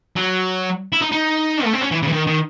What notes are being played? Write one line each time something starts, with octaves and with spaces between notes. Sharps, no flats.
F#3
E4
D#4
D#4
A3
C4
C#4
E3
C#3
E3
D#3
D#3